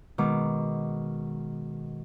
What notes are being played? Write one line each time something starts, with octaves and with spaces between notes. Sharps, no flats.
B2 D#3 G#3 D6